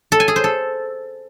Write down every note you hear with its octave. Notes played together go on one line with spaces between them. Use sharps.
A4
G#5
G#4
C5
A4